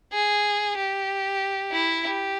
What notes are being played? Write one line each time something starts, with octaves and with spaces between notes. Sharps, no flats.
G#4
G4
E4
G4